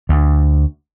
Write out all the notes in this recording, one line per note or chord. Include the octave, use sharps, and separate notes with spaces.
D2